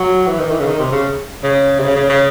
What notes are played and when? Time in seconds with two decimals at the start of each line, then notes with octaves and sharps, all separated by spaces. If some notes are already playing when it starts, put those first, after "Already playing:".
Already playing: F#3
0.27 E3
0.39 D#3
0.51 E3
0.60 C#3
0.66 D#3
0.79 C3
0.92 C#3
1.43 C#3
1.79 C3
1.83 C#3
1.96 C#3
2.09 C#3